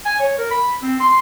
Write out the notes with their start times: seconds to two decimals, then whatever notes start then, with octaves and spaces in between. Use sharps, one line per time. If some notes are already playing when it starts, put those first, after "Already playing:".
0.06 G#5
0.20 C#5
0.38 A#4
0.51 B5
0.83 C4
1.00 C6